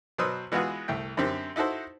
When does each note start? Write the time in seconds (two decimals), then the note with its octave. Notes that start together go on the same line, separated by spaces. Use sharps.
0.18 B2 F#3 B4 C5 D#6 E6
0.52 E3 G#3 B3 F4 F#4 G#4
0.88 C2 A3 G5
1.17 F#2 D3 C4 G4
1.56 D#4 E4 F#4 A4 C5